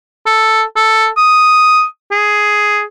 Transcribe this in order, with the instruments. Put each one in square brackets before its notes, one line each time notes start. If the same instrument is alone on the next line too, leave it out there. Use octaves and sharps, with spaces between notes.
[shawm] A4
A4
D#6
G#4